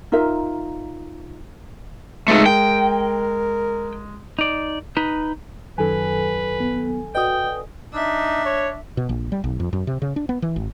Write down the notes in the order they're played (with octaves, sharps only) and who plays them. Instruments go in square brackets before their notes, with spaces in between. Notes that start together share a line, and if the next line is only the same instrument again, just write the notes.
[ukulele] D#4 F4 A#4 E5
[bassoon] C#2 [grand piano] G#3 [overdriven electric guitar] A3 D#4
[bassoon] A#4 [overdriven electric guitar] G5
[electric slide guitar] D#4 D5
D#4 B4
[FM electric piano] F#2 D#3 F#3 [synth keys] A4 G#5 [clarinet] B4
[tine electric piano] B3
[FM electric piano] F#4 D5 D#5 [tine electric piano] B4 D#6 [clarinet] G5
[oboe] D4 [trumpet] D#4 [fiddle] E5
[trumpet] C#5
[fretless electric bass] B2
A#1
G3
B1
F2
F#2
C3
C#3
D4
B3
E3
G#1